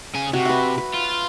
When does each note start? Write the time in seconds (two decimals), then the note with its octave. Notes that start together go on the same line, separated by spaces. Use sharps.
0.14 C#3 G#5
0.33 C3 F#4
0.45 B4 E5
0.78 B4
0.94 F4